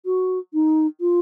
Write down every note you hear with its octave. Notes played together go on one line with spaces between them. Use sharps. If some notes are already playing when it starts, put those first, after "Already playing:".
F#4
D#4
F4